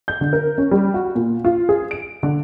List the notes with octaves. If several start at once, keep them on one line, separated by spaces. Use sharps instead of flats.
G6
D3
A#4
C#4
G3
F#4
A#2
F4
G#4
D7
D3